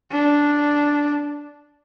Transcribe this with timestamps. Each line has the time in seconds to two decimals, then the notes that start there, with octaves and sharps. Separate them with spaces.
0.12 D4